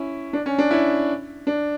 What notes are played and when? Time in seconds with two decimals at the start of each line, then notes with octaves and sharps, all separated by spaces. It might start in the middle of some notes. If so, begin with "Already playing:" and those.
Already playing: C#4 E4
0.33 D4
0.46 C#4
0.58 D4
0.71 C#4 E4
1.47 D4